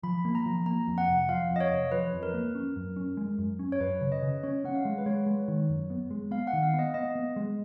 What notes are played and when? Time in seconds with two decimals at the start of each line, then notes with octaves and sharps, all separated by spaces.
0.03 F3 B5
0.25 A#3
0.35 A#5
0.46 F3
0.66 A#3 A#5
0.88 F2
0.98 F#5
1.08 F1
1.29 F3 F5
1.50 F2
1.56 D#5
1.60 C#5
1.71 F1
1.92 F3 B4
2.13 F2
2.23 A#4
2.34 A#3
2.55 C#4
2.76 F#2
2.96 C#4
3.17 G#3
3.38 F#2
3.59 C#4
3.72 C#5
3.80 F#2 B4
4.01 C#3
4.12 D#5
4.23 C#3
4.43 C#4 C#5
4.64 C#4 F#5
4.75 F5
4.85 G#3
4.98 B4
5.06 G#3 C#5
5.26 G#3
5.48 D#3
5.69 F#2
5.90 B3
6.11 G#3
6.31 B3 F5
6.47 F#5
6.53 D#3
6.63 F5
6.74 B3
6.79 D#5
6.94 B3 D#5
7.15 B3
7.36 G#3